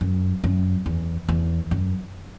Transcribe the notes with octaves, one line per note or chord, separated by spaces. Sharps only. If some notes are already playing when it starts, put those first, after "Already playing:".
F#2
F#2
E2
E2
F#2